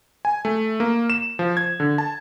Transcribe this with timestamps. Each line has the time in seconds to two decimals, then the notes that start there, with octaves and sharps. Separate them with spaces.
0.25 G#5
0.45 A3
0.80 A#3
1.10 E7
1.39 F3
1.57 G#6
1.80 D3
1.98 A5